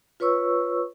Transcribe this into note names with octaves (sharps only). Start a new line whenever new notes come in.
F4 B4 C#5 C#6 E6